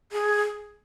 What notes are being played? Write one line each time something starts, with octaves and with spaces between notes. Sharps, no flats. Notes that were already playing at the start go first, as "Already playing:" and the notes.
G#4